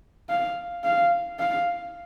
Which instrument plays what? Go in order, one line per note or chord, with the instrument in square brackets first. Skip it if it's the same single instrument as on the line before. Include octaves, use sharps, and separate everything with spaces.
[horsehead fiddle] F5
F5
F5